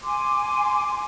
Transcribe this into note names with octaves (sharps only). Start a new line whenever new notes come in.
G#5 C6 D6